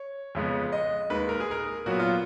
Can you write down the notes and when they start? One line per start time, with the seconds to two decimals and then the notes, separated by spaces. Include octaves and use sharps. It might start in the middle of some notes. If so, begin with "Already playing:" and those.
Already playing: C#5
0.35 F2 C#3 G#3 B3
0.72 D#5
1.10 D#2 D#3 G#3 B4
1.29 A#4
1.40 G#4
1.51 A#4
1.86 A#2 F#3 B3 F#4
1.99 F4